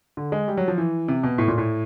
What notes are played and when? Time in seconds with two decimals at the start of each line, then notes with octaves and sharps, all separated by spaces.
0.17 D3
0.32 G#3
0.48 G3
0.57 F#3
0.68 F3
0.78 E3
1.08 C3
1.23 B2
1.38 A2
1.48 A#2
1.58 A2